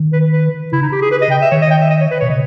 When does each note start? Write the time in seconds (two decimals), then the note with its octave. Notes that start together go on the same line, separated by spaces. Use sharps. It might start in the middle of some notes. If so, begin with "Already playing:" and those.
Already playing: D#3
0.13 B4
0.32 B4
0.72 C#3 E4
0.82 D#4
0.92 G4
1.01 G#4
1.11 B4
1.22 D#5
1.31 G5
1.42 E5
1.51 D#3 C#5
1.61 D#5
1.71 G5
1.81 E5
1.90 D#5
2.01 C#5
2.11 B4
2.20 B2 C#5
2.30 C#3 D#5